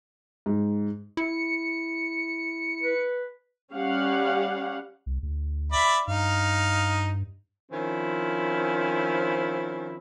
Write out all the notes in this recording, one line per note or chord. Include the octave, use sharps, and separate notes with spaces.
G#2
E4 C#7
B4
G3 C#4 G4 F5 F#5
C2
D2
D5 E5 B5
G2 D#4 F5
D#3 F3 C4 C#4 E4